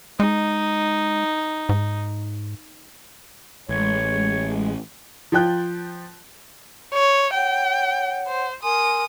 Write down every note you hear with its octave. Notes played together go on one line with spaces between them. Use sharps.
G#3 D#4
G#2
A1 G#3 C#5
F3 F4 G5 F#6 G6
C#5
C#5 F#5 G5
C5
A#4 G#5 C6 D#6